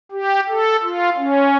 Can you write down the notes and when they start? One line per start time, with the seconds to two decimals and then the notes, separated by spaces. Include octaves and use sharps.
0.12 G4
0.49 A4
0.83 F4
1.17 C#4